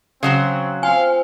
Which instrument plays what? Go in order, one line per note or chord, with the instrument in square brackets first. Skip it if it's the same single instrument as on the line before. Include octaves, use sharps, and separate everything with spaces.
[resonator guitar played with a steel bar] C#3 F#3 F#4 [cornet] C4
[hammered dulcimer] C4 F4 [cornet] F5 [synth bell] G#5